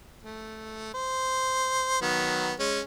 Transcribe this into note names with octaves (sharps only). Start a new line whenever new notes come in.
A3
C5
D#3 F#3 B3
G#3 C#4